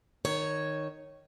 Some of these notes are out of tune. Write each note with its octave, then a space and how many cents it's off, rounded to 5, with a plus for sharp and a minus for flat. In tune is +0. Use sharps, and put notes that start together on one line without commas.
D#3 -10 C#5 +0